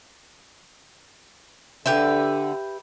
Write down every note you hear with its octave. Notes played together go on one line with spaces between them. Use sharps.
D3 G4 B4 E5